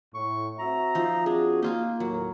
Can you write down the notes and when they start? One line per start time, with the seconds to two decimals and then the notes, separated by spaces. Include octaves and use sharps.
0.14 A2 C#6
0.59 C4 F#4 E5 A#5
0.95 F3 D#4
1.26 C4 D4 F#4 G#4
1.62 A#3 D#4 F4 G#5
2.00 D#2 A2 F#3 A#4